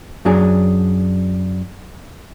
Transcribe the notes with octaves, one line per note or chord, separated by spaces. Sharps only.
F#2 F#3 D4 G#4